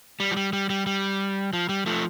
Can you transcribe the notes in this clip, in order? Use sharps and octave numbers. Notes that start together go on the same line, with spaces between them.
G3
F3
G3
G3
G3
G3
F3
G3
F3 A3